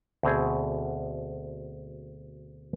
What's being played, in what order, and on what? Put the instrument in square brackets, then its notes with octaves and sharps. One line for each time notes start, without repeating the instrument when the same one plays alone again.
[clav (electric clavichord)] D2 B2 C4 G#4